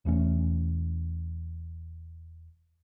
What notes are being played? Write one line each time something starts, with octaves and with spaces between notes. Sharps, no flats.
E1 E2 A3 C#4